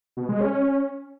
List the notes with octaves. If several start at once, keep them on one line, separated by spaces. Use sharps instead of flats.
B2
G#3
C#4